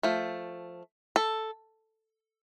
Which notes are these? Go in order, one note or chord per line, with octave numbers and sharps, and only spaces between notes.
F3 A3
A4